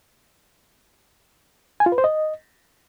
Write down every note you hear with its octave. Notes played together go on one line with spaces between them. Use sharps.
G#5
F4
B4
C5
D#5